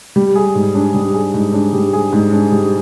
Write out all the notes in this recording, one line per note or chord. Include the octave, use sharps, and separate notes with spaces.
G3
G#4
G#2
D4
G3
G#4
G#2
D4
G3
G#4
G#2
D4
G3